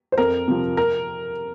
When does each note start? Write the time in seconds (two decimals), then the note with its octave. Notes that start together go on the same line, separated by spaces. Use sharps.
0.12 C5
0.18 F2 A#4
0.48 C3 F3
0.77 A#4